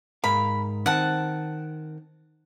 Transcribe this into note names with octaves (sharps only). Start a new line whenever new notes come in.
G#2 A#4 F5 B5
D#3 C4 F#5 A5